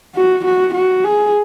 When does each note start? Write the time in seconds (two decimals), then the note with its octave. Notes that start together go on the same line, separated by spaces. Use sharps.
0.15 F#4
0.45 F#4
0.74 F#4
1.04 G#4